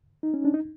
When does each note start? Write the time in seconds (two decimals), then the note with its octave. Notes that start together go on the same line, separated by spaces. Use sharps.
0.23 D#4
0.34 C#4
0.45 D4
0.54 D#4